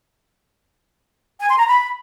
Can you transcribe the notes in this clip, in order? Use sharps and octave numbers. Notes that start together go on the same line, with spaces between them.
G#5
C6
A#5
B5